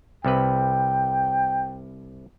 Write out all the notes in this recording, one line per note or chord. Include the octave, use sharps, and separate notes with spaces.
C2 C3 B4 G5